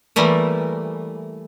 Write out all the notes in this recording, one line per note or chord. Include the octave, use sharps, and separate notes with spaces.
E3 G3 A3 A#3